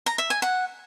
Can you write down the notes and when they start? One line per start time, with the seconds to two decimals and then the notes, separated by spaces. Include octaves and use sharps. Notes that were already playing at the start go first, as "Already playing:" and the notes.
0.06 A#5
0.18 E5
0.30 G#5
0.42 F#5